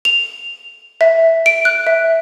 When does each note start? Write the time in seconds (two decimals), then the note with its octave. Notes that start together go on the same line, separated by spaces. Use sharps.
0.05 F7
1.01 E5
1.46 D7
1.65 F#6
1.87 E5